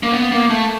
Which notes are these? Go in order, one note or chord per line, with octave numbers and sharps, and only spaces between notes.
A#3
B3
A#3
A3